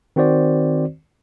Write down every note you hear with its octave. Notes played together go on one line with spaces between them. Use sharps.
D#3 C4 F#4 C5 D5